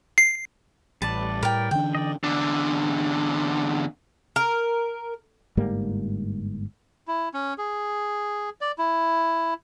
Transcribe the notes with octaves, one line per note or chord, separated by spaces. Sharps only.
C7
A1 G3 B4 D5 A5
A2 A#4 G5
D3 E3 D4 G5
D5 D#5
E2 D3
A#4
G1 G#2 G3 A#3
E4
C#4
G#4
D5
E4